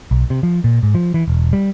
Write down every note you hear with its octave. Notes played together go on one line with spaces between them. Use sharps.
B1
C3
F3
A#2
G#2
F3
E3
E1
G3